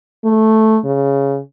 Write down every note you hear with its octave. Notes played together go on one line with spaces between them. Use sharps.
A3
C#3